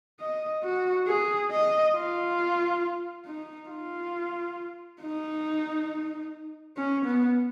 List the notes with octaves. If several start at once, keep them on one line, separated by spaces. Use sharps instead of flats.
D#5
F#4
G#4
D#5
F4
D#4
F4
D#4
C#4
B3